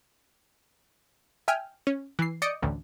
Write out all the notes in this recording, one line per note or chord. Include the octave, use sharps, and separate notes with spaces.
E5 G5 G#5 F6
C#4
E3 C7
D5 D#5 D#6 G6 C#7 D7
A1 D2